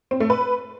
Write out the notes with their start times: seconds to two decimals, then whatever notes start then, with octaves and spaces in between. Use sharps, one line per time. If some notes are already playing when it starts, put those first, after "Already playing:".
0.11 C4
0.20 A3
0.30 B4